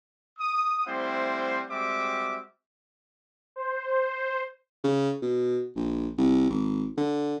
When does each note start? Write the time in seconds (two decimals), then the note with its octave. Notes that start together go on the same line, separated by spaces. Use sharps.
0.39 D#6
0.85 G3 A3 C4 E4 C5 F#5
1.68 G3 G#3 C4 F#4 E5 D6
3.56 C5
4.84 C#3
5.22 B2
5.76 A#1
6.18 C2
6.50 G#1
6.97 D3